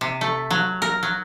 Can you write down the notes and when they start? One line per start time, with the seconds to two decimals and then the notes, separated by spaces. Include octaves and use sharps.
0.01 C3
0.21 A3
0.51 F#3
0.82 A#4
1.03 F#3